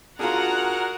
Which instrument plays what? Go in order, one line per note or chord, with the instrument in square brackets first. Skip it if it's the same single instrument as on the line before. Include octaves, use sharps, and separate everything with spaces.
[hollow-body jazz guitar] D4 F4 [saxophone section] F#4 G#4 A#4 [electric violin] F#5 A#5